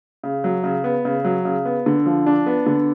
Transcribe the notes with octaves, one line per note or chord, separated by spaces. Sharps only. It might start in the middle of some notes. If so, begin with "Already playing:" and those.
C#3
F#3
C#3
B3
C#3
F#3
C#3
B3
D3
F3
D4
B3
D3